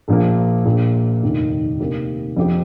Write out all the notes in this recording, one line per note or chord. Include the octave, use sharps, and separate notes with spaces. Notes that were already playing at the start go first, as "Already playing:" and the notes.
A#1 A#2 F3 A#3
A#1 A#2 A#3
F1 D#2 D#3
C3 D#3 A#3 G4 A#4
F2 F3 C4 G4